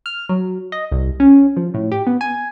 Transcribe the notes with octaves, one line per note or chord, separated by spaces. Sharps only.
F6
F#3
D#5
C2
C#4
F3
A2
G4
B3
G#5